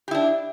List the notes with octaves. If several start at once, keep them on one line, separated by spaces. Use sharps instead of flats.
D4 E4 G4